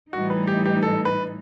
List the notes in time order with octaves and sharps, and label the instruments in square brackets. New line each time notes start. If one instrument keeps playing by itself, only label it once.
[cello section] A2 E3 G3 D#4 [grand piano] F#4
[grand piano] B4
G4
G4
A4
B4